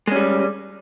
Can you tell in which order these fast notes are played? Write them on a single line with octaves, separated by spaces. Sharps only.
G#3 C#4 G3